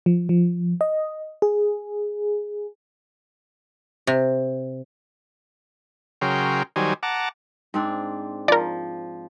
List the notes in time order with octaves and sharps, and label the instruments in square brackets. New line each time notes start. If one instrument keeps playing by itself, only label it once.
[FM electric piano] F3
F3
D#5
G#4
[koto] C3
[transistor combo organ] C#3 F#3 A#4 G5 C6
D#3 F#3 G3 C5 G#5
F#5 A5 A#5 D6
[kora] G#2 C4 D4
[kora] F3 [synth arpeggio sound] A#4 D5